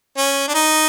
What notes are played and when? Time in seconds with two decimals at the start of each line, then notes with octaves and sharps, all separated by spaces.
0.18 C#4
0.48 D4
0.55 D#4